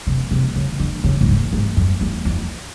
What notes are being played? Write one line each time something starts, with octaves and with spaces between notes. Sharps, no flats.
C3
C3
C#3
D3
C#3
A2
G#2
G#2
F#2
E2
F2